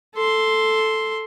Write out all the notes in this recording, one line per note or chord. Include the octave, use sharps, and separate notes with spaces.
A4 C6